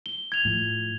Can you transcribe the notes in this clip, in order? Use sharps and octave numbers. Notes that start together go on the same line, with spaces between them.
G7
G#6 F7
A2 F3